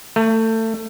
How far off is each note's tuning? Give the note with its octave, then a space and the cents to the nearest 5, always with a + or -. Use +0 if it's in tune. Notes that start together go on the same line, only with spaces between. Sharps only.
A3 +25